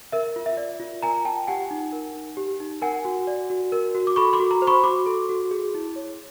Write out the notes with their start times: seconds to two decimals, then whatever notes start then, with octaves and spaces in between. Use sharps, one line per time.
0.12 A#4 E5
0.36 F4
0.46 E5
0.57 D5
0.80 F4
1.03 A#4 G#5 A#5
1.25 F4 G5 A5
1.47 G4 F#5 G#5
1.71 D#4
1.93 A#4
2.15 D#4
2.37 G4
2.60 D#4
2.82 A#4 F#5 G#5
3.05 F#4
3.27 D5
3.50 F#4
3.72 A#4
3.95 F#4
4.07 D6
4.16 A4 B5 C#6
4.33 C6 D6
4.40 F#4
4.51 A#5 C6
4.62 C5
4.67 B5 C#6
4.84 F#4 C6 D6
5.06 A4
5.29 F#4
5.51 G#4
5.74 E4
5.96 C#5